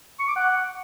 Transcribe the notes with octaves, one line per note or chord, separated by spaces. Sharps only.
C#6
D6
F#5